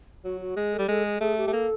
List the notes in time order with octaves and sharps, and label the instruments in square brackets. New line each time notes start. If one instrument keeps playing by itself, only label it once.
[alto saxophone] F#3 [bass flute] F#4
[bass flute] F#4
[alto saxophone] G#3 [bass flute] G#4
[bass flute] A4
[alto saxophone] G3
[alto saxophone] G#3 [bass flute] A4
[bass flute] G#4
[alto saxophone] A3 [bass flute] G#4
[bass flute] G4
[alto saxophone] A3
[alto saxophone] A#3 [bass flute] A4